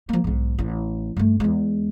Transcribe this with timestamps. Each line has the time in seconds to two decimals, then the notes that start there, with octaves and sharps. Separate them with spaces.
0.09 F3 A#3
0.24 B1 G#2
0.58 A1
1.16 G2 A3
1.40 E2 G#3